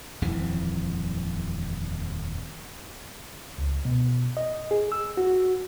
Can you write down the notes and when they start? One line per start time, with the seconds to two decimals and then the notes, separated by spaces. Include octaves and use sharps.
0.22 D#1 F2 E3 F3
3.58 C#2
3.85 B2
4.37 D#5
4.71 G#4
4.92 E6
5.17 F#4